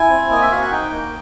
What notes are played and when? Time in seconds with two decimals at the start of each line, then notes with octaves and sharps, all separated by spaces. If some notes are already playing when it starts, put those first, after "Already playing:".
Already playing: E4 G#5
0.09 C4
0.30 A#3 D#5
0.42 E5
0.51 F#4 F5
0.62 F#5
0.72 D#4 G5
0.92 A#3